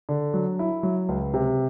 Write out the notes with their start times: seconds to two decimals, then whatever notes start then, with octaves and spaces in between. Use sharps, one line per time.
0.09 D3
0.34 F#3
0.59 E4
0.83 F#3
1.09 C#2
1.34 C3